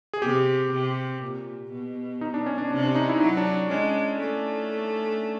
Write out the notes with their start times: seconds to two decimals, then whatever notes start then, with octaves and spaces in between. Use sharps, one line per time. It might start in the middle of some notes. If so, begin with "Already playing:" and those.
0.14 G#4
0.22 C3 G4
0.72 C3
1.22 A#2
1.72 B2
2.21 D#4
2.34 D4
2.46 C#4
2.58 D4
2.71 C3 D4
2.84 D4
2.95 D#4
3.09 E4
3.20 F#3 D#4
3.37 D4
3.70 G#3 C#4
4.20 A3